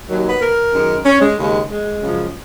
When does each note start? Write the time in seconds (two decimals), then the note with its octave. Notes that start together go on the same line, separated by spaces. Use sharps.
0.09 D#2 D#3 F#3
0.26 B4
0.41 A#4
0.73 F#2 D#3 G#3
1.05 C#4
1.21 G#3
1.38 D#2 C#3 G#3
1.70 G#3
2.01 F#2 C#3 F3